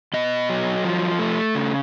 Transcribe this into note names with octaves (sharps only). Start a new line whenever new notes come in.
B2 D#5
F#3
F3
A3
C#3